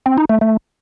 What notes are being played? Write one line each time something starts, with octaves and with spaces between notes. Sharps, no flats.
C4
D#4
A3
A3